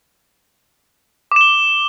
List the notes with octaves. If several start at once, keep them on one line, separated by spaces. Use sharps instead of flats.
D6 E7 G7